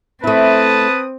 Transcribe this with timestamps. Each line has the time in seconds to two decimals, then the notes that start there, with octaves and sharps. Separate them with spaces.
0.24 A3 C4 E4 B4 A5 D#6